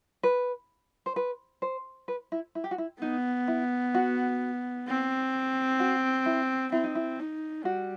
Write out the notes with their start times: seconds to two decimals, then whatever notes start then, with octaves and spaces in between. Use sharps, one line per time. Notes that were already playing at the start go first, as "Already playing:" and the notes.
0.23 B4
1.06 C5
1.16 B4
1.62 C5
2.08 B4
2.32 E4
2.55 E4
2.64 G4
2.71 F#4
2.78 E4
3.01 B3 D#4
3.48 E4
3.94 F#4
4.87 C4
5.80 F#4
6.26 E4
6.72 C4 E4
6.84 D#4
6.95 E4
7.19 D#4
7.65 G3 F#4